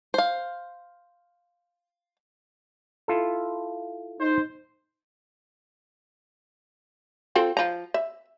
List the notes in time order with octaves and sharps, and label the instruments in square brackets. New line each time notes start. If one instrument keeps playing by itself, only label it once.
[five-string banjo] C5 F5
[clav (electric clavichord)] E4 F4 A4
[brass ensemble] D#4 C5
[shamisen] C4 F4 A4
F3 A#5
E5